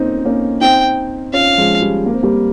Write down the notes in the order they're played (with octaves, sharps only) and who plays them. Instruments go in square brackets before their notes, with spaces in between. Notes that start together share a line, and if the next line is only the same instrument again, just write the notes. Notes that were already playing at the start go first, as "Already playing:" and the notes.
Already playing: [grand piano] A#3 C4 C#4 D#4
A#3 C#4
[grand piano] C4 D#4 [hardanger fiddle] G5
[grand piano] C#4 F4 [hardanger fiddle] F5
[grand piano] F3 G#3
G3
A#3
C4
G3 A#3